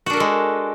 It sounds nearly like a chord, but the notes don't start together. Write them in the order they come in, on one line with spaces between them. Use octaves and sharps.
F#4 D4 A#4 A4 G#3